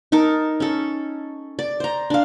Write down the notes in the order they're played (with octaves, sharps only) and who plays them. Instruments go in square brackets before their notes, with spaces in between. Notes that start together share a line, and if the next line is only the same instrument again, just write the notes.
[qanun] D#4 A4 A#4 A5
C#4 A4
D5
C5 A#5
D4 F5